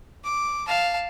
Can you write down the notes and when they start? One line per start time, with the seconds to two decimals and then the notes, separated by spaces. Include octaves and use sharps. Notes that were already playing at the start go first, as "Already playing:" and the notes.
0.24 D6
0.67 F5 A5